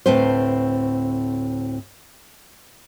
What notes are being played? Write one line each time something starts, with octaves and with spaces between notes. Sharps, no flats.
D2 A2 C4 B4 C5